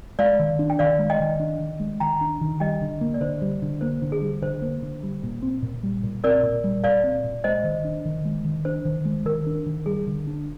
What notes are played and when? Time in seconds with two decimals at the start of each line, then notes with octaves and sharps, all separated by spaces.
0.19 G#3 D5 F5
0.39 D#3
0.59 D4
0.70 G5
0.79 D#3 D5 F5
0.99 G#3
1.10 D#5 G5
1.20 D#3
1.40 D4
1.60 D#3
1.80 G#3
2.00 D#3 G5 A#5
2.21 D4
2.41 D#3
2.60 G3 D#5 G5
2.81 D3
3.01 A#3
3.14 D5
3.21 D3 C5
3.42 G3
3.62 D3
3.81 A#3 C5
4.02 D3
4.12 G#4
4.21 G3
4.42 D3 C5
4.62 A#3
4.82 D3
5.03 G3
5.23 A#2
5.42 C4
5.62 A#2
5.83 G3
6.03 A#2
6.24 C4 A#4 D5
6.43 A#2
6.64 G3
6.84 A#2 D5 F5
7.03 C4
7.24 A#2
7.44 G#3 C5 D#5
7.64 D#3
7.85 D4
8.05 D#3
8.25 G#3
8.45 D#3
8.65 D4 C5
8.85 D#3
9.05 G#3
9.25 D#3 A#4
9.47 D4
9.66 D#3
9.86 G3 G#4
10.07 D3
10.27 D4